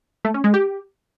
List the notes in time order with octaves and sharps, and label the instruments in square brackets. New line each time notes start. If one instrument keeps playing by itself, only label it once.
[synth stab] A3
C#4
G#3
G4